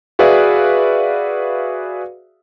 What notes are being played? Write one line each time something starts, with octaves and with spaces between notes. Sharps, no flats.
F#4 G#4 B4 D5 E5 F5